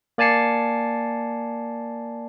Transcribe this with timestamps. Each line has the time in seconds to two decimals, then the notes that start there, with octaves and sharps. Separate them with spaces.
0.18 A#3 D5 G#5 A5 C7 C#7